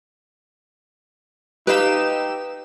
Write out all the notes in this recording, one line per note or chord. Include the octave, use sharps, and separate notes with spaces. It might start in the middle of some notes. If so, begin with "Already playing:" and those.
D#4 G4 B4 F5 E6 E7